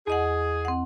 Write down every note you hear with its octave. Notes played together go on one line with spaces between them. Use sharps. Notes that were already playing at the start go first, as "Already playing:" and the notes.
E2 G#4 D#5 F#5
C4 F#5